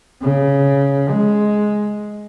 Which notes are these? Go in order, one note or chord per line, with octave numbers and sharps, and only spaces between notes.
C#3
G#3